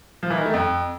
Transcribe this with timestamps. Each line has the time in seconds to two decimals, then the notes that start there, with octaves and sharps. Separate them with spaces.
0.23 F3
0.30 E3
0.38 D#3
0.46 A3
0.54 F2